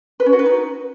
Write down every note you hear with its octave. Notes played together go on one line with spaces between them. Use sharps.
B4
C#4
F#4
B4
D#4